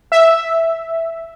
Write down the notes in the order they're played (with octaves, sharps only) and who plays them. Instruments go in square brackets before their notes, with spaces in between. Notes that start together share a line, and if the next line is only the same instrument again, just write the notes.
[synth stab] E5